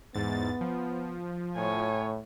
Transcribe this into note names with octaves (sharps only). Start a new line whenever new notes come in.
E2 G#2 B3 A6
F3
A2 C#5 G#5